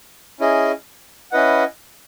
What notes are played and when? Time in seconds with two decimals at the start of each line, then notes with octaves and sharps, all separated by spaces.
0.40 C#4 E4 G#4 D#5
1.32 C#4 E4 B4 D#5 F#5